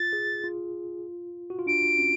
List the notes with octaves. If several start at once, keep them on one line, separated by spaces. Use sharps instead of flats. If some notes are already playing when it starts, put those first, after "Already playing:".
Already playing: F4 A6
G#4
F4
F#4
F4
D4 D7
C#4